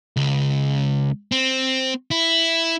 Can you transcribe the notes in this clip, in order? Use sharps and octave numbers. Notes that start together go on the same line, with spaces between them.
C#2
C4
E4